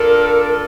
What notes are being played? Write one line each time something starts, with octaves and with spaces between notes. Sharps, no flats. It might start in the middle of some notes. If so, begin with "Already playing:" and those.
Already playing: D4 F4 A4 A#4 D5